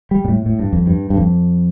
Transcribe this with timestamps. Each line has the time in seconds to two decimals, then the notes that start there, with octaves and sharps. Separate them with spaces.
0.11 G3
0.25 A#2
0.28 A2
0.46 A2
0.59 G2
0.73 F2
0.87 G2
1.10 G2
1.17 F2